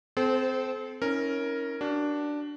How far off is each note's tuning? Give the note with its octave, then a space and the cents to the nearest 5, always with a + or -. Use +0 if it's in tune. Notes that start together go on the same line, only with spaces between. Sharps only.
C4 -25 A4 -35 C5 +0
C#4 +0 E4 -45 A#4 +0
D4 +0 F#4 +30